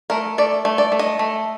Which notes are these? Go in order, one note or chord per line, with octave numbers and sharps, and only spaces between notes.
A3 A#4
A3 D5
A3
D5
A3
D#5
A3